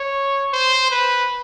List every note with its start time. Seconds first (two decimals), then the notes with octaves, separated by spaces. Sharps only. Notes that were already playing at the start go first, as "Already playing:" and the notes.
Already playing: C#5
0.53 C5
0.91 B4